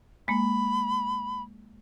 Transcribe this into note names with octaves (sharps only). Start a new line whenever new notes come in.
G#3 A#3 B5